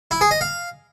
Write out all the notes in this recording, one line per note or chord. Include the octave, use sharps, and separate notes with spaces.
E4
G#4
D#5
F5